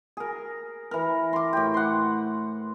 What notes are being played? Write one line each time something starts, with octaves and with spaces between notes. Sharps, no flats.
G#4 A#4
E3 A#4
C6 D6
A2 G4
F#5 C6